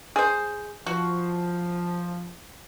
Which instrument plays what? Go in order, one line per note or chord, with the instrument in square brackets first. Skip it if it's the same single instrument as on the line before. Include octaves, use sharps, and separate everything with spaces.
[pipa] G#4 C5
[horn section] F3 [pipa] F#4